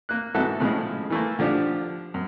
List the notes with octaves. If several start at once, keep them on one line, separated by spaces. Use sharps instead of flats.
A#3 F#6
G#2 E3 F#4 A4 E5 F#6
A2 C#3 F3 G#3
E3 A3 A#3
D3 F3 D4 F4 G4
F#2